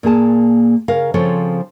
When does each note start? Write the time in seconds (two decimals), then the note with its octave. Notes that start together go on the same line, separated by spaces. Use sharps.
0.03 A#2 A#3 G#4 A5
0.88 C#3 A#4 F5
1.14 C#3 F3 C4 A4 C#5